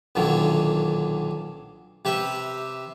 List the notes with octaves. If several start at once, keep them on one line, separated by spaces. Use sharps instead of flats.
B1 A#2 D3 D#3 F#3
C3 G4 B4 E5